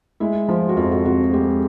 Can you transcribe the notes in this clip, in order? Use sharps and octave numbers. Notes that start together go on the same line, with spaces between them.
G#3 E4
F3 F4
F#4
F2 F4
F#4
C3 F#4
G#3 G4